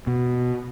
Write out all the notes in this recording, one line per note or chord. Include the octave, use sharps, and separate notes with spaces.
B2